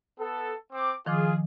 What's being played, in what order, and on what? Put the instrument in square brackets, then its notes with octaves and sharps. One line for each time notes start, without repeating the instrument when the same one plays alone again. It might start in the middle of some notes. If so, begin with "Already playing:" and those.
[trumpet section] B3 A4
C4 D6
[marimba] D#3 F3 D6 [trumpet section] F4 G#4